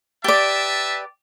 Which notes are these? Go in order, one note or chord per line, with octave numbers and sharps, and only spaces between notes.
G4 B4 D5 E5 A5